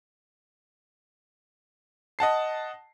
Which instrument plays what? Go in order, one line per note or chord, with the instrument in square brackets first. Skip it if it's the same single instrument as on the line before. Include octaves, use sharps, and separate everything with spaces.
[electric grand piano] D#5 F#5 A5 C7